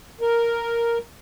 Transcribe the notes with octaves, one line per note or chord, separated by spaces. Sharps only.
A#4